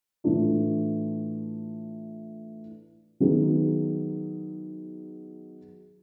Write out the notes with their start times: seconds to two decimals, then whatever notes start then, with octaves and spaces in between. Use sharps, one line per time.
0.24 A2 E3 A3 D4 F4
3.20 D#3 F#3 B3 D#4 G#4